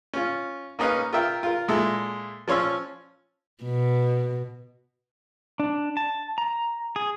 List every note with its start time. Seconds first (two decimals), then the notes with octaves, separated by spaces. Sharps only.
0.14 C#4 F4
0.79 A#3 C#4 D#4 B4 F5
1.13 F4 A#4 E5 G5
1.43 F4 A#4
1.68 A#2 G#3 E4 A4
2.48 F3 C#4 C#5 C6 E6
3.63 B2
5.60 D4
5.97 A5
6.38 A#5
6.96 G#4